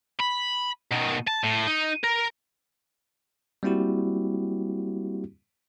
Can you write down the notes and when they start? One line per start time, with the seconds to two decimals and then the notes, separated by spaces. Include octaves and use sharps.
0.20 B5
0.92 B2 D#3
1.28 A5
1.44 A2
1.67 D#4
2.04 A#4
3.63 G3 A#3 C4 E4 F#4 G4